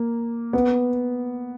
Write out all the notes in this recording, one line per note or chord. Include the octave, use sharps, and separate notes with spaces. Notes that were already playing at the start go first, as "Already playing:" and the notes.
Already playing: A#3
B3